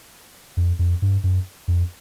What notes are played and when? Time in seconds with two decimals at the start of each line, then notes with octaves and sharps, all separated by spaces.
0.57 F2
0.79 F2
1.02 G2
1.24 F#2
1.68 F2